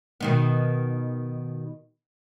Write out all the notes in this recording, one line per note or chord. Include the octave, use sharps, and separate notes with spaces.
B2 D#3 B3